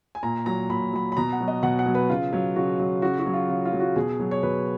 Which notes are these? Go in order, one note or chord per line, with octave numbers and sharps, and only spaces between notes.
G#5
A#2 A#5
F#3 A#5
A#2 B5
F#3 B5
B5
B2 A#5
F#5
F#3
D#5
B2 F#5
F#5
F#3
B4
C#3 F4
F#3
C#3 F#4
F#3
C#3 F#4
F#4
F#3
F4
C#3
F4
F#3
F#4
B2 G#4
F#3
C#5
B2 B4